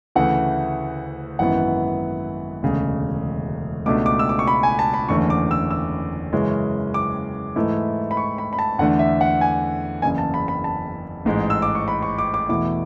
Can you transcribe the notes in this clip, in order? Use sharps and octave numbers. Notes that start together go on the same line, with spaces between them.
D2 C#3 E3 A3 F#5
G#1 F#2 E3 B3 E4 F#5
E1 D2 C#3
C#2 B2 A3 D4 D6
D6
E6
D6
C#6
B5
G#5
A5
B5
F#1 E2 D3 A3 C#4 C#6
D6
E6
E6
F#2 C#3 E3 G#3 C#4
D6
G#2 E3 A3 E4
B5
C#6
B5
B5
A5
E2 D3 A3 D4 F#5
E5
F#5
G#5
F#1 E2 C#3 G#5
A5
B5
B5
A5
A1 G#2 G#3
E6
D6
C#6
B5
C#6
D6
D6
E2 B2 A3 E4 D6